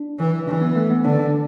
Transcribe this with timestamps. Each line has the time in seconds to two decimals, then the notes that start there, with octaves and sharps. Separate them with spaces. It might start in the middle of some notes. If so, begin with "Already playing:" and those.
Already playing: D4
0.18 E3
0.47 E3 D4
0.61 B3
0.76 A3
0.90 B3
1.04 D3 D4
1.19 D4